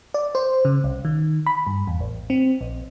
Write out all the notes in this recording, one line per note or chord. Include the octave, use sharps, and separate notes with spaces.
D5
C5
C#3
C2
D#3
B5
G2
E2
A1
C4
A#1